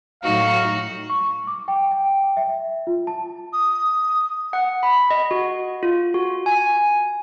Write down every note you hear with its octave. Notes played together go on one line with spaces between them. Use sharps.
A2 F#3 D#4 F#4 F5
C#6
D6
G5
G5
E5
F4
A5
D#6
F#5
B5
D#5
F#4
F4
F#4
G#5